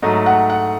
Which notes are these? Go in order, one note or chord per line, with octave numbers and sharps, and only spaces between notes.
G#2 F#3 A3 D#5
F#5
F#5